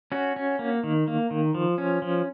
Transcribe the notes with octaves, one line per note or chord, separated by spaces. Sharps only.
C#4 F#4
C#4
A#3
D#3
A#3
D#3
F3
C#4
F3